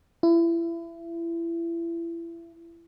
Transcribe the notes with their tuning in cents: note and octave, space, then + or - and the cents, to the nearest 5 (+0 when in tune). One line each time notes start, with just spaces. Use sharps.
E4 +30